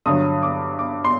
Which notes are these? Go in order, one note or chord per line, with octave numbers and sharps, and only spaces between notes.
G2 D3 F#3 D#6
D6
D6
C6